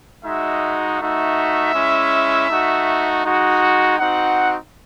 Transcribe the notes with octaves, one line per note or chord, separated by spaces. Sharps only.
G#3 D#4 F#4 E5
A3 D#4 F#4 E5
G#3 C#4 E4
A3 D#4 F#4
G#3 D#4 F#4
C4 D#4 F#4 F#5